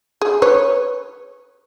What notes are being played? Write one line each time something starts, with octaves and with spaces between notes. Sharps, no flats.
G#4
B4 C#5